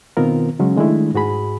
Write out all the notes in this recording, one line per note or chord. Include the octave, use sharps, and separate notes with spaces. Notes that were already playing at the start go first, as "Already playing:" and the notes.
B2 D#3 B3 C4 F4 A#4
C#3 F#3 G#3 C#4
D#3 G#3 A3 D4 E4
G#2 F#4 G#4 B5